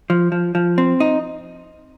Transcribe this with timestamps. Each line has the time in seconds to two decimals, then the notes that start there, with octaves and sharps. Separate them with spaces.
0.10 F3
0.32 F3
0.55 F3
0.78 C4
1.00 D#4